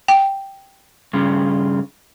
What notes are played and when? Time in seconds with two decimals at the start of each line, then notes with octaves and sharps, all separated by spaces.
0.08 G5
1.13 G2 C#3 F4